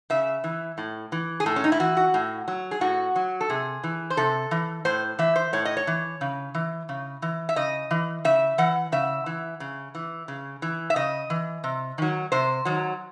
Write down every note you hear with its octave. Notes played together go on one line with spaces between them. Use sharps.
C#3 E5
E3
A2
E3
G#4
A2 A4
C#4
D#4
E4
E3 F#4
F#4
A2
F#3
G#4
A2 F#4
F#3
A4
C3 G#4
E3
C5
C3 A4
E3
A2 C5
E3 E5
C5
A2 C#5
D#5
C#5
E3
C#3
E3
C#3
E3
E5
C#3 D#5
E3
C#3 E5
E3 F#5
C#3 E5
E3
C#3
E3
C#3
E3
E5
C#3 D#5
E3
C3
D#3 F#3
C3 C5
D#3 F#3